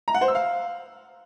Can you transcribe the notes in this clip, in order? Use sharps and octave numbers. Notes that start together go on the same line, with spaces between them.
A#5
F#5
C5
E6
F5